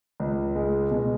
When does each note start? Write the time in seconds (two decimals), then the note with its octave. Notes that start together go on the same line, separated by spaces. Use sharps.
0.20 C#2
0.56 G#3
0.91 B2